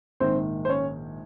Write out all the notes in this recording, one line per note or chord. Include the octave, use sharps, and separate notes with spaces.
A#1 G#2 D#3 C4 C5
C5
C#4 C#5